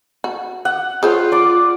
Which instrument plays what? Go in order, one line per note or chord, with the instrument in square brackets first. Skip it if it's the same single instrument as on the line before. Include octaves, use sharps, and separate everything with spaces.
[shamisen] F#4
[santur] F#5
[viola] F4 [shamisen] G#4 C5 C#5
[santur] D5 D6